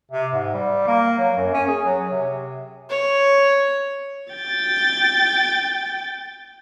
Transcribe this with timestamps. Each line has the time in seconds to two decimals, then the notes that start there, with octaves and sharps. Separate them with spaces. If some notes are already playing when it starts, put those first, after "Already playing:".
0.11 C3
0.33 G#2
0.54 G3
0.87 A#3
1.18 F#3
1.37 F#2
1.54 C#4
1.68 G#4
1.85 F#3
2.12 C3
2.90 C#5
4.33 G5 A6